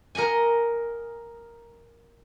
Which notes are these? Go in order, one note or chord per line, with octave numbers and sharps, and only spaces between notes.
A#4 D#5 F#5 G#5